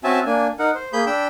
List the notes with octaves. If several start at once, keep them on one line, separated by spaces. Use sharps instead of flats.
C4 C#4 F#4 E5 G#5 A5
A#3 D4 G#5
D#4 A#4 F#5
C5
A#3 G#4 B5 G6
D4 G5 B5 E6